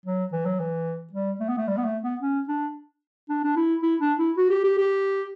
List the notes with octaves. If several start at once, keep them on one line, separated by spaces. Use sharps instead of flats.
F#3
E3
F#3
E3
G3
A3
B3
A3
G3
B3
A3
B3
C#4
D4
D4
D4
E4
E4
D4
E4
F#4
G4
G4
G4